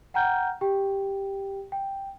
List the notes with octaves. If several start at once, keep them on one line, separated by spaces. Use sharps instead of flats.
F#5 G5 A#5 F6 G6
G4 G5
G5